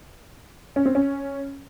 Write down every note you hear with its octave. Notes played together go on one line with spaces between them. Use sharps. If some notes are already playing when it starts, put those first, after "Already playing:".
C#4
C4
C#4